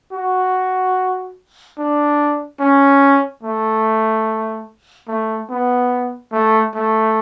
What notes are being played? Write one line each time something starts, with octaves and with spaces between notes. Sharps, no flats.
F#4
D4
C#4
A3
A3
B3
A3
A3